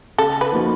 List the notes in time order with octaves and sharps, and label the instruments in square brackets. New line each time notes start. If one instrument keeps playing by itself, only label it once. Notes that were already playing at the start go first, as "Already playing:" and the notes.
[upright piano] C#3 [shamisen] A4
[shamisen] B4
[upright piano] F3 A#3 D#4 F#4